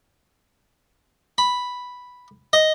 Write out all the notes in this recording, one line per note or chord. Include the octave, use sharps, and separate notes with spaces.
B5
D#5